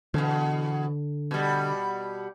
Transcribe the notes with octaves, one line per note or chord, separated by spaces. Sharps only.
E2 B2 D3
B2 G3